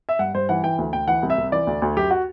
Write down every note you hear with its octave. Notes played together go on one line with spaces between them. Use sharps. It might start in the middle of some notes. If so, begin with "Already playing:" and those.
E5
G2 F#5
G2 C5
E3 F#5
E3 G5
D2
D2 G5
E3 F#5
C2
E5
C2
E3 D5
D2
D2
F#2 G4
F#4